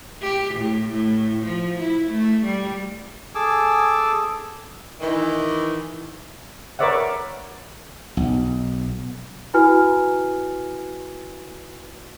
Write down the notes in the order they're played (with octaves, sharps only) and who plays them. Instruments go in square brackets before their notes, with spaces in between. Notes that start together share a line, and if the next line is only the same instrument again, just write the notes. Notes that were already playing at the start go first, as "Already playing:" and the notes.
[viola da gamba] G4
A2
A2
F3
E4
A3
G3
[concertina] G#4 A4 G#5 D6 E6
[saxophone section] D#3 E3
[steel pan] A#4 B4 C#5 D5 E5 F#5
[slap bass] B1
[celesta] E4 F#4 B4 G#5 F6